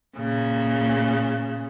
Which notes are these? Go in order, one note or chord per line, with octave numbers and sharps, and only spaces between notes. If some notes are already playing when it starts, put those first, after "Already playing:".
A#2 C#3